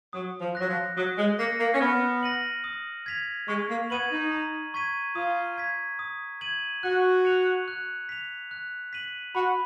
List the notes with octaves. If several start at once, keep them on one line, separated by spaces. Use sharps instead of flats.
F#3 D#6
F3
F#3 F#6 A#6
F3
F#3 D#6
G#3
A#3 A#6 C#7
A#3
C#4
B3 F6
A#6 D#7 F#7
D#6
G#6 B6 F7
G#3 C#6
A#3
B3 G#6 D#7 F#7
D#4
A#5
C#6 G#6 B6 D#7
F4 D#6
G#6 B6
D#6
G#6 D#7 F#7
F#4 F#6
C#7 F7
F#6
B6 F7
F#6
B6 D#7 F#7
F#4 B5